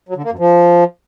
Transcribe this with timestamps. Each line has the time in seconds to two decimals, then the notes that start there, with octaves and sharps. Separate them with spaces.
0.09 F#3
0.16 D3
0.24 A#3
0.31 F#2
0.39 F3